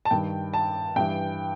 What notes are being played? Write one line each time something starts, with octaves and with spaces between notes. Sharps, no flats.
A5
G2 D#3 G5
A5
G2 E3 G5